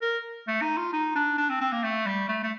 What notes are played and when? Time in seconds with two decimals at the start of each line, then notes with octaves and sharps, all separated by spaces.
0.02 A#4
0.48 A3
0.62 D#4
0.77 F4
0.93 D#4
1.16 D4
1.38 D4
1.49 C4
1.61 C4
1.73 A#3
1.83 A3
2.07 G3
2.29 A3
2.43 A3